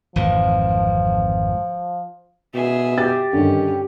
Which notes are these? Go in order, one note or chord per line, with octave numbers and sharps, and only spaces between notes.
G#1 F2 E3 F3
B2 G#4 E5
G4 A6
G2 D3 D#3 C#4